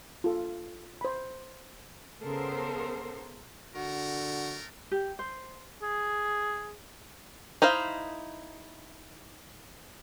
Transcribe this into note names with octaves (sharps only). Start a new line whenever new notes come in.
F4 A4
C5 B5
C#3 B3 A4 A#4 C5
D3 A3 F#4 A#4
G4
C5
G#4
D#4 E4 C5 F5